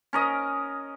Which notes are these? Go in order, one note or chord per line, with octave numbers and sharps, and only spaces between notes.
C#4 A#4 D#5